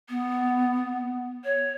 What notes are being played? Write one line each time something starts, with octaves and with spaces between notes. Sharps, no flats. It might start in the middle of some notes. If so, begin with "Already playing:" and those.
B3
C#5